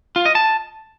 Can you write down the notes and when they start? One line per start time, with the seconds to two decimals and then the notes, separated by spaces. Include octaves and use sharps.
0.16 F4
0.26 D#5
0.35 A5